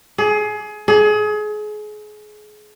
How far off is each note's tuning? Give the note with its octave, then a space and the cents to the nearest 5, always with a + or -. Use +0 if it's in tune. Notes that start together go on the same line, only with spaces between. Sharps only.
G#4 +25
G#4 +30